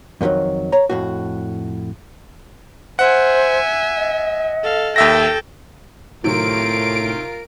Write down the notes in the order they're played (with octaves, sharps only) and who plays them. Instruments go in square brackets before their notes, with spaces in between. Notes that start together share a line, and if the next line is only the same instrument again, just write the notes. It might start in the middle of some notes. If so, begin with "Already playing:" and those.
[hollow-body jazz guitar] F2 A2 D3 D#3 F#3
C#5 A#5
F2 A2 F#4
[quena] C5 [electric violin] E5 G#5 [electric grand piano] F#5
[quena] D#5
[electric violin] A4 F5
[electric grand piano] D#2 E5 A#6 [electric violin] A4 G5
[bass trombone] A2 [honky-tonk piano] C3 D#3 F#3 [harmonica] F4 A#4 [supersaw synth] D7